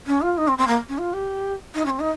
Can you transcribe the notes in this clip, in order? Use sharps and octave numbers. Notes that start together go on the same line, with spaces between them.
C#4
F4
D#4
C4
C4
A#3
C#4
F4
G4
D#4
C#4
C4
D#4